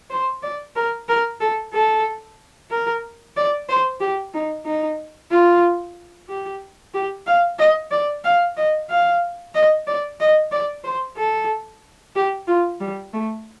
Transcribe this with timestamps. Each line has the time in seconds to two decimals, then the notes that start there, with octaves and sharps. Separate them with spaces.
0.10 C5
0.42 D5
0.76 A#4
1.08 A#4
1.40 A4
1.73 A4
2.70 A#4
3.36 D5
3.69 C5
4.00 G4
4.34 D#4
4.65 D#4
5.30 F4
6.29 G4
6.94 G4
7.26 F5
7.59 D#5
7.91 D5
8.24 F5
8.57 D#5
8.89 F5
9.54 D#5
9.87 D5
10.20 D#5
10.51 D5
10.84 C5
11.17 A4
12.15 G4
12.47 F4
12.80 G3
13.13 A3